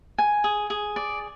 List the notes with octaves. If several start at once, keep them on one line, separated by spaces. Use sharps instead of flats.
G#5
G#4
G#4
D5